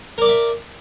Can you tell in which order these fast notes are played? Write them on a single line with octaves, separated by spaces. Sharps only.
A#4 D5 D6 E5